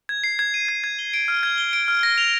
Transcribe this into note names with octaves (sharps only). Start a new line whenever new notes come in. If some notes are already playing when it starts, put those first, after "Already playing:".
G#6
C7
G#6
D#7
G#6
G#6
G7
D7
F6
G#6
G7
D7
F6
A#6
F7